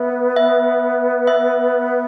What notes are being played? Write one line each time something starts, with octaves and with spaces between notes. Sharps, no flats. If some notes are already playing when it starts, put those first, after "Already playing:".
Already playing: B3 E5
E5
E5